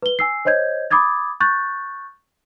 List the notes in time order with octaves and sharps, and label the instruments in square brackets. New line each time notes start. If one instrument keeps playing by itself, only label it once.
[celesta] B4 G7
G#5 E6 C7
C5 C#5 D#5 G6 G#6
B5 D6 D#6 G#6 A6
C#6 F#6 G6 A6